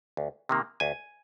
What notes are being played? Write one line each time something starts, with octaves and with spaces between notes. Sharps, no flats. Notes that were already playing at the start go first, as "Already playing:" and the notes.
D2
C3 D#3 A#3
D2 G#5